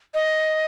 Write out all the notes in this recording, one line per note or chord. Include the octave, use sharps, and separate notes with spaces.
D#5